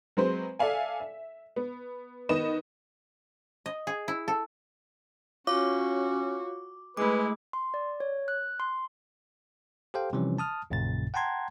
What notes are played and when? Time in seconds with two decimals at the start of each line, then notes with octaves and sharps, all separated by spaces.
0.17 F#3 G#3 C4 B4 C5
0.59 A4 D5 E5 F5 G#5
1.00 E5
1.56 B3
2.29 D#3 B3 D#5 E7
3.66 D#5
3.87 G#4
4.08 E4
4.28 A4
5.47 C#4 F4 F#4 C#5 F5 D6
6.97 G#3 A3 E4 B4 D6
7.53 C6
7.74 D5
8.00 C#5
8.28 F#6
8.60 C6
9.94 G4 A4 C5 F5 G5
10.13 C3 E3 F3 G3 C#4 C5
10.38 A5 D#6 F6
10.70 A#1 F#2 A#2 C#3 A6
11.14 F#5 G5 A5 A#5 C6 G#6